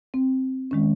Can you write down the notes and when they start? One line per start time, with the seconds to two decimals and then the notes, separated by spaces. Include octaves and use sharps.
0.14 C4
0.71 D#3 G#3 C#4